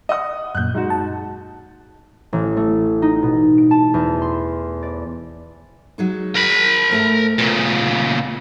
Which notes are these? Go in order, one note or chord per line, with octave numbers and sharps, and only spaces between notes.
D#5 F#5 D#6
F#2 A#2 F#6 G6
G#2 D#4 F#4
A5
A1
A3
D#4
B2
D7
A5
E2
C6
D5
F#3 G#3 D#4
A#4 B5
G#2 A3 A#5
A#2 C#3 B3